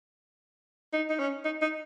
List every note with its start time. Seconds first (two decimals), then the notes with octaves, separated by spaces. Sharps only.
0.93 D#4
1.10 D#4
1.19 C#4
1.45 D#4
1.62 D#4